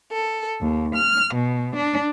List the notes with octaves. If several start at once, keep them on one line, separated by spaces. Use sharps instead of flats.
A4
D#2
F6
B2
D4